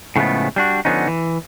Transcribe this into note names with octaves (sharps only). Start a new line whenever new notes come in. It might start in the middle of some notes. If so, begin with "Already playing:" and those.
A2 C#3 F3 G#3 A3 B3
G3 D4 F#4
D3 F3 B3 C#4 D#4
E3